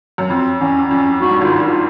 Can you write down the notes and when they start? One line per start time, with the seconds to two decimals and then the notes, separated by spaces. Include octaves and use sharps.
0.18 F#2
0.29 F2 C4
0.60 E2 C#4
0.91 F2 C#4
1.21 G#2 F#4
1.31 G2
1.41 G#1 G#2
1.44 F4
1.66 F4